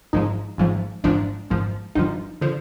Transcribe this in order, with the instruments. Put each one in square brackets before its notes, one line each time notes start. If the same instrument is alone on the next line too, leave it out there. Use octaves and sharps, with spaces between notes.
[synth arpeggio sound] G#1 G#2 F3 D#4
G#1 G#2 F3
G#1 G#2 F3 D4
G#1 G#2 F3
G1 G2 D3 F3 D#4
D3 F3